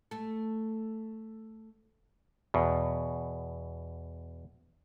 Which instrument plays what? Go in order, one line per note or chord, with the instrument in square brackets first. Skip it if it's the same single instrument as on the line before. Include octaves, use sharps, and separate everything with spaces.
[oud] A3 A4
[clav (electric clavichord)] E2 B2